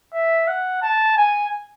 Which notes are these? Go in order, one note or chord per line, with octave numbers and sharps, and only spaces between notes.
E5
F#5
A5
G#5